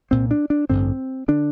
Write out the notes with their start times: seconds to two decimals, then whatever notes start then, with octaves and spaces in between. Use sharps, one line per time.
0.11 C2 A#2 C4
0.31 D4
0.50 D4
0.70 A1 G2 D3 C4
1.28 D3 D4